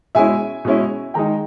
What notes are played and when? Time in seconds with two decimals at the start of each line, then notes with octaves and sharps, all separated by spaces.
0.15 B2 G#3 C#4 E4 E5 G#5
0.65 B2 G#3 C#4 E4
1.14 D#3 G#3 D#4 G5 A#5